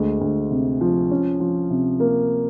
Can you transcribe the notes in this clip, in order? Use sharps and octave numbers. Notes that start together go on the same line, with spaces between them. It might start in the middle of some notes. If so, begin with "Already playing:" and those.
Already playing: D2 G#3
D2
C3
F3
C#4
F3
C3
A#3